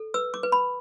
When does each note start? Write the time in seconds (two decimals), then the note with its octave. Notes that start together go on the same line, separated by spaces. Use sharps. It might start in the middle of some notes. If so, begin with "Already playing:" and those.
Already playing: A4
0.14 B4 E6
0.34 D6
0.43 B4
0.52 B5